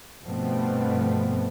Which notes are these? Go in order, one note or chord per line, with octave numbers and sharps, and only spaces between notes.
G2 B2 F3 A3 B3 C4